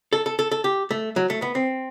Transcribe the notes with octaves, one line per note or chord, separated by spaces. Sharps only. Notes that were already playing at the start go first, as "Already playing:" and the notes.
A4
A4
A4
A4
G4
A3
F#3
A3
B3
C4